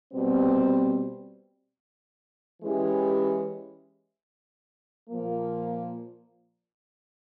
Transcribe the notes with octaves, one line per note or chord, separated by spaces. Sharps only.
B2 G3 C4
E3 G#3 C#4 E4 G4
A#2 F3 A#3